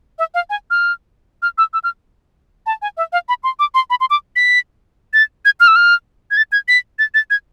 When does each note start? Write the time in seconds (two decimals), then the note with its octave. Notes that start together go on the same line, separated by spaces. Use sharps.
0.19 E5
0.34 F5
0.50 G#5
0.71 F6
1.42 F6
1.58 E6
1.74 E6
1.84 F6
2.66 A5
2.82 G#5
2.97 E5
3.13 F5
3.29 B5
3.44 C6
3.59 D6
3.75 C6
3.90 B5
4.00 C6
4.10 D6
4.36 B6
5.14 A6
5.45 G#6
5.60 F6
5.68 E6
5.76 F6
6.31 G#6
6.37 A6
6.52 G#6
6.68 B6
6.99 A6
7.14 A6
7.30 G#6